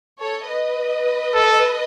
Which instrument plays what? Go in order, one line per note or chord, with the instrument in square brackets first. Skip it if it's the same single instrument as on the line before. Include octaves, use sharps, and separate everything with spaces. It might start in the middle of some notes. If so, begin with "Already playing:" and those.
[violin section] A4 C#5
B4 D#5
[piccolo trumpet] A4